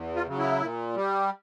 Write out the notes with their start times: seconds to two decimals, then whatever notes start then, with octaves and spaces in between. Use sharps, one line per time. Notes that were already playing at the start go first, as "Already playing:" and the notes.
Already playing: E2
0.16 F4
0.27 C#3 F#3
0.39 E4
0.61 A#2
0.96 G3